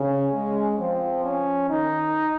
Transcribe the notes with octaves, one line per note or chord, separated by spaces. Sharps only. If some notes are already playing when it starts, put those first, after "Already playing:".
Already playing: C#3 C#4
G#3
F3 C4
C#4
D#3 D#4